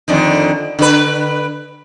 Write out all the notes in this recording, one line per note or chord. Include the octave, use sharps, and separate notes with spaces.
F2 D3 D#3
D3 B4